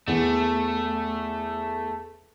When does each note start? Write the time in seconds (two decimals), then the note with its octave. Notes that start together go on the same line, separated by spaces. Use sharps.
0.08 E2 A3